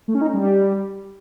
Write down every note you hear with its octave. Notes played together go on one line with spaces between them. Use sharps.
A3
C#4
D#4
C#4
G3